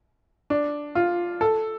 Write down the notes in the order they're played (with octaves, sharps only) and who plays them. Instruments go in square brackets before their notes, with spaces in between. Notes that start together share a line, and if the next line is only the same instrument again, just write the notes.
[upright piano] D4
F4
A4